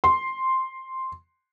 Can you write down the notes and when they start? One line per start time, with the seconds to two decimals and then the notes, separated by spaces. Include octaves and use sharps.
0.04 C6